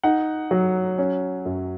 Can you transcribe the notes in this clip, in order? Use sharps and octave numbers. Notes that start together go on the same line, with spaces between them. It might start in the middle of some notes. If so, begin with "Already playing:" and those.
D#4 F#5
F#3
C#4
F#2